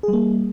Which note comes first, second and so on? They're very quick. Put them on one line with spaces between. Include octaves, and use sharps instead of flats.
G#4 G3 A#3